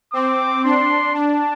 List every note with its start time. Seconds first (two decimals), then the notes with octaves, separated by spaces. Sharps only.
0.13 C4 D6
0.64 D4 C6
1.15 D4 A5